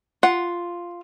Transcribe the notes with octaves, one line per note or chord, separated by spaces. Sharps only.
F4 F#5